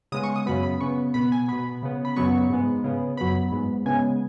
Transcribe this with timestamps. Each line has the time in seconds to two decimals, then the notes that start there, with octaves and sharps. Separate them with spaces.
0.12 C#3 G#3 B3 D#6
0.23 C#6
0.36 D#6
0.46 F#2 C#3 F#3 B3 B5
0.63 B5
0.81 C#3 B3 C#6
1.14 B2 B3 B5
1.32 G#5
1.48 B2 B3 B5
1.83 C#3 B3
2.05 B5
2.16 F#2 C#3 F#3 B3 C#6
2.50 G#2 G#3 B3
2.84 C#3 B3
3.17 F#2 F#3 B3 B5
3.51 G#2 G#3 B3
3.86 C#3 G#3 B3 G#5